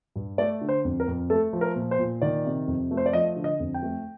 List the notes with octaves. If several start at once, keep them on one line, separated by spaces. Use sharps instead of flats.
G2
A3 D5
D3
C5
F2
A#4
F2
A3 A4
F3
A#4
A#2
C5
A#2
D#3 D5
C3
F2
A3
C5
D5
F3 D#5
D3
D#5
F2
G5
A3